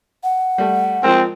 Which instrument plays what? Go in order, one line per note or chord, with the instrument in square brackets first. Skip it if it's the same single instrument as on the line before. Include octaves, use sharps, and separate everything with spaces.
[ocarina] F#5
[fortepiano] G3 A3
[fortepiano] F3 G#3 A#4 [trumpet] C4